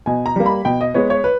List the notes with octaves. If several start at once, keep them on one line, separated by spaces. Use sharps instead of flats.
B2 G#5
A#5
G3 A#3
B5
B2 G5
D#5
G#3 B3 C#5
C#5
B4